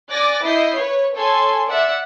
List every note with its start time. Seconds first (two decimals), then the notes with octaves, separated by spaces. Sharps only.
0.11 D5 G#5 D6 F#6 A6 A#6
0.44 E4 D#5 G6 C7
0.77 B4 C#5
1.16 A4 C#5 G#5 C6
1.69 D5 E5 F#5